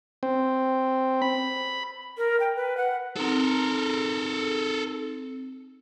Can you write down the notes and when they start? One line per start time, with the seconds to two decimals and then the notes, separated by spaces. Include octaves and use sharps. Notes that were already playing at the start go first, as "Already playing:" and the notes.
0.23 C4
1.22 B5
2.18 A#4
2.40 G5
2.56 B4
2.77 F#5
3.17 C4 D#4 A4 A#4